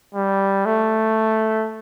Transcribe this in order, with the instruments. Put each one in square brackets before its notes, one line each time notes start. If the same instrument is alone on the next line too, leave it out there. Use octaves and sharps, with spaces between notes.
[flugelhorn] G3
A3